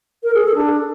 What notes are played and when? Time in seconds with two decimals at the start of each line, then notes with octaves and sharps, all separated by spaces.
0.24 A#4
0.34 G#4
0.45 A4
0.55 D4